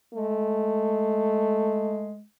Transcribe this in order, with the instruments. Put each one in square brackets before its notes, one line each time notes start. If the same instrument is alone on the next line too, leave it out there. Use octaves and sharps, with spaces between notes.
[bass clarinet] G#3 [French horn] A3